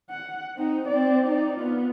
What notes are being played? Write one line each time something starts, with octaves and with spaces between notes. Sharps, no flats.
F#5
C4 D#4
C4 D5
D#4 D5
B3 F4